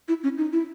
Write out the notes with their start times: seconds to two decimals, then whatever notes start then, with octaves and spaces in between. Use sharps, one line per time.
0.08 E4
0.23 C#4
0.38 D#4
0.53 E4